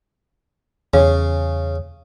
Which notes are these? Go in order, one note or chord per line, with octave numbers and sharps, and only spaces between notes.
E2 C#3 C#5